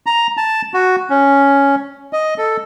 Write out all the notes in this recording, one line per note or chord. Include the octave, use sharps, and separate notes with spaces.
A#5
A5
F#4
C#4
D#5
A4